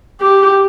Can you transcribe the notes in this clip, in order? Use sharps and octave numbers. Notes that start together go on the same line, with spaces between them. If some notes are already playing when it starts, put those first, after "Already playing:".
G4